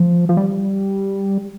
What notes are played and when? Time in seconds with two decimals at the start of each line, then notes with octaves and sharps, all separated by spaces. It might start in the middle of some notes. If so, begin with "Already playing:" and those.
Already playing: F3
0.29 F3
0.37 G3